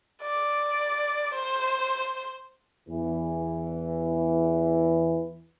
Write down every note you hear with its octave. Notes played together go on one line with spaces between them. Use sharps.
D5
C5
E2 E3